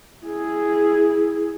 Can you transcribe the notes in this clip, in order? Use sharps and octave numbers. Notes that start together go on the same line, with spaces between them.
E4 G#4